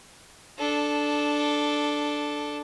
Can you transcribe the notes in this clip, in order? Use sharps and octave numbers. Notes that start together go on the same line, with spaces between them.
D4 A4